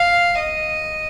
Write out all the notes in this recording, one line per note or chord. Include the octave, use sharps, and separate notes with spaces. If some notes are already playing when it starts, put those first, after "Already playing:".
Already playing: F5
D#5